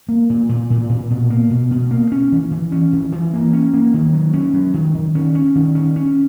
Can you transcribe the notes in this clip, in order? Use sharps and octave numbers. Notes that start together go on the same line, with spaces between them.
A#3
A#2
A#2
A#2
A#2
B2
A#3
B2
B2
A#3
C#4
E3
E3
C#4
E3
E3
A#3
C#4
A#3
D#3
F#3
C#4
F#3
D#3
D#3
C#4
C#4
D#3
C#4
C#4